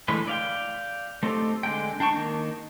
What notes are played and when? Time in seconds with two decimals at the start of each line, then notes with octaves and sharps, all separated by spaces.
0.08 D3 E3 G#3 A3 B4
0.28 D5 F5 G5
1.23 A3 C4 D#4 G4 A4
1.63 D3 G#3 G5
2.00 D4 G5 A5 C#6
2.12 D#3 A#3 D#4